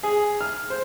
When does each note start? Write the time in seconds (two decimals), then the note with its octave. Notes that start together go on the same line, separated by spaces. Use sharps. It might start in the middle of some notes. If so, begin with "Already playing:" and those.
0.03 G#4
0.41 F6
0.70 C5